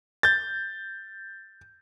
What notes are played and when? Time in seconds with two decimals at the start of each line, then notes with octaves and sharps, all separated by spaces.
0.23 G6 A6